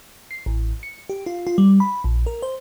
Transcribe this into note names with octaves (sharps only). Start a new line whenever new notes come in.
C7
A1
C#7
G4
F4
F4
G3
B5
A#1
A#4
C5